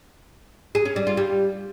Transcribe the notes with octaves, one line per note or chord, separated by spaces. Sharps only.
G#4
C#4
G3
F4
G3